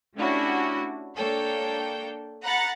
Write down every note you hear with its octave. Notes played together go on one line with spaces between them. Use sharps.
A3 C#4 D4 E4 F#4 G4
A#3 D4 A4 C#5 G5
F#5 A#5 B5 F#6 A6 C#7